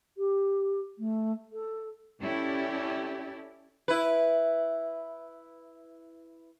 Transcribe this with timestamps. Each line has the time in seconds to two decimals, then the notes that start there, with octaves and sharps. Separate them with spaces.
0.17 G4
0.98 A3
1.53 A4
2.22 C#4 E4 G4 A4 D5
3.88 E4 B4